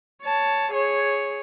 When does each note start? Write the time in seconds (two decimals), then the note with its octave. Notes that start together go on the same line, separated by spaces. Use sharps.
0.23 C#5 A5
0.72 G#4 C#5